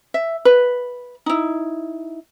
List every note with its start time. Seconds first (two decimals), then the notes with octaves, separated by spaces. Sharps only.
0.14 E5
0.45 B4
1.26 D#4 E4